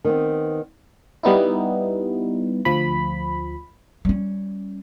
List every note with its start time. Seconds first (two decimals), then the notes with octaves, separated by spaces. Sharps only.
0.04 D#3 B3 C4
1.23 G3 B3 D#4 E4
2.65 D2 F3 B5
4.05 G3 C#4